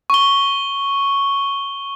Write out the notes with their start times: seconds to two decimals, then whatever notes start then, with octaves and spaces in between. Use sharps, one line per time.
0.10 C#6 G7